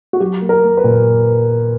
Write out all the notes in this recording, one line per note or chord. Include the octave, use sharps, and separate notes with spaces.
F#4
F#3 G4
A#3
A#4
A#3
B4
A#2